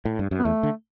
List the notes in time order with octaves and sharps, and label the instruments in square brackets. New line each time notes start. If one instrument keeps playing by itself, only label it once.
[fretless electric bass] A2
G2
F#2
[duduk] B3
[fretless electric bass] E2 [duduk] A3
[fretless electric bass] D3